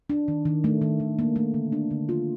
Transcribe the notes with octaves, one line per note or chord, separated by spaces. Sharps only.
D4
D#3
D#3
A3
D#3
D#3
A#3
A3
D3
D4
D3
F4